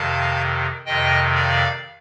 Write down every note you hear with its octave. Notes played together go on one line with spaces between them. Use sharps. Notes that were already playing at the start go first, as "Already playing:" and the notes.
Already playing: F2 C3 D#3 F5 A5
F2 C3 D#3 D#5 G5
D5 F5